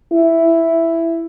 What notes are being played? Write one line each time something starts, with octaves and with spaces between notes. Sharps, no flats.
E4